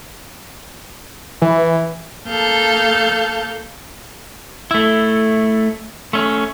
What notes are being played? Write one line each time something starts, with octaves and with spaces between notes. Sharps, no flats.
E3
A#3 A4 F5 A5 G6
A3 E4
A3 C#4